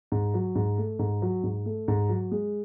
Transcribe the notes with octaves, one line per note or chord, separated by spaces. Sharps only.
G#2
F#3
G#2
A3
G#2
F#3
G#2
A3
G#2
F#3
G#3